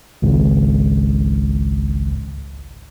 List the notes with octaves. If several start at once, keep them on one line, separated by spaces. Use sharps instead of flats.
G#1 C#2